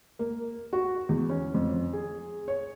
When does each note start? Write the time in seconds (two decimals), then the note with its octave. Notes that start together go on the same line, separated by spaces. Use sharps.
0.19 A#3
0.73 F#4
1.09 E2
1.30 C#4
1.54 F2
1.93 G#4
2.48 C#5